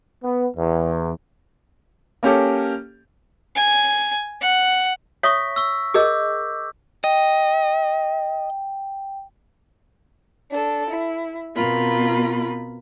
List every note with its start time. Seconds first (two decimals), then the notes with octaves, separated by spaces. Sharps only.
0.23 B3
0.57 E2
2.23 A#3 C#4 G4 A4
3.56 G#5
4.41 F#5
5.23 C#5 E5 C#6 D#6 A#6 B6
5.56 C#6 E6
5.94 G#4 A#4 D#5 D6 E6 G6
7.04 D#5 G5
10.50 D4 A4
10.89 E4
11.55 B2 B3 C4 F4 A#4 B5